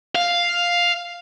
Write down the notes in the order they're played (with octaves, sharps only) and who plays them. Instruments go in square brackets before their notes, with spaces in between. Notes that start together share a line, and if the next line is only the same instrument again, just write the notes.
[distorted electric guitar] F5